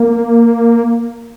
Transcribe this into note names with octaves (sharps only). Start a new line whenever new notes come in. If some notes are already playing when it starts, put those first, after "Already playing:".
Already playing: A#3